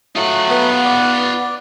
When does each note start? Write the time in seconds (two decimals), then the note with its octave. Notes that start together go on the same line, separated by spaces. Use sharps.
0.16 F#3 A3 F4 F#5 D#6
0.50 B3
0.85 D5